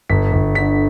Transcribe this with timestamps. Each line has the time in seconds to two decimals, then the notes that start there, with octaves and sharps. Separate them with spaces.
0.10 G1 B6
0.33 G1
0.55 D3 B6